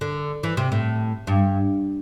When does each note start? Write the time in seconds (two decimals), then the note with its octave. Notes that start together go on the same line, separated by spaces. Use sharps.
0.01 D3
0.43 E3
0.57 C3
0.72 A2
1.27 G2